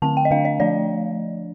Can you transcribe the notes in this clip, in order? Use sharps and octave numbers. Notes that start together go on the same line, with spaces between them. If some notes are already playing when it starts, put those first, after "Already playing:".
D3 A3 C4 A5
G5
D#5
D3 A3 D4 F5
D#5
F3 A3 D4 D5